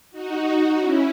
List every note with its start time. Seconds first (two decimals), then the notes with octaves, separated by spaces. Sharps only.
0.11 D#4 F#4
0.77 C#4 E4